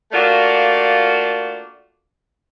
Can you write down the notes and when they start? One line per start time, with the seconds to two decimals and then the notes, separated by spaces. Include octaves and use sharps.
0.12 A3 A#3 D4 F4 F#4